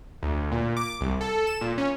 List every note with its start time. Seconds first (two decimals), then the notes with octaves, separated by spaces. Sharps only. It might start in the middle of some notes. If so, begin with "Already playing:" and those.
0.23 D2
0.52 A#2
0.77 D6
1.01 C2
1.21 A4
1.47 E7
1.61 A#2
1.78 C#4